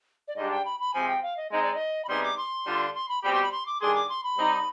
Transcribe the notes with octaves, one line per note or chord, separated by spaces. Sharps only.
D5
G#2 G3 D4 G4 D#5
G5
B5
B5
C3 F3 G#3 C4 G#5
G5
F5
D#5
G#3 C4 D#4 D#5
D5
D#5
B5
C3 G3 B3 D#4 G#4 C6
D6
C6
D3 G3 D4 F4
C6
B5
B2 G3 C4 G4 B5
C6
B5
C6
D6
D#3 G3 D4 G#4 C6
D6
C6
B5
G3 C4 D#4